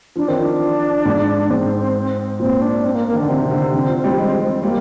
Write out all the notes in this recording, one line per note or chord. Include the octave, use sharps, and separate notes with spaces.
F3 D4
D#3 C4
F3 D4
G#2
G#2 C4
A#2 C4
D4
C4
A#3
A#3
D#3
D3 D4
C3 C4
C3
D3
C3
D3
F3
G3
G#3
G#3
G3 A#3